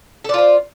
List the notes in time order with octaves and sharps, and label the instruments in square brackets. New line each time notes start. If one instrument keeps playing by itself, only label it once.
[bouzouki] A4
D5
F4
C5